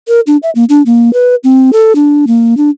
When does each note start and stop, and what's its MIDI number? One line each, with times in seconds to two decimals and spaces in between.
0.08 0.20 70
0.27 0.37 62
0.43 0.50 76
0.55 0.65 58
0.69 0.82 62
0.86 1.13 58
1.13 1.35 71
1.44 1.70 60
1.73 1.93 69
1.95 2.25 62
2.27 2.57 58
2.57 2.70 62